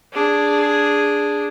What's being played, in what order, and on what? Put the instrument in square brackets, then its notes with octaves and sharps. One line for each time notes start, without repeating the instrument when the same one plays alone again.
[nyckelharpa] D4 G#4